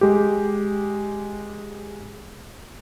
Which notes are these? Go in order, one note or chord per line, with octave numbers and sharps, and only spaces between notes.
G#3 G4